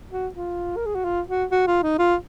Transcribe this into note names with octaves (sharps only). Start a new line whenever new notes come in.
F#4
F4
A#4
G#4
F#4
F4
F#4
F#4
F4
D#4
F4